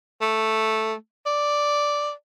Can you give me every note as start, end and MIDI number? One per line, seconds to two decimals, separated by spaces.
0.21 0.94 57
1.26 2.11 74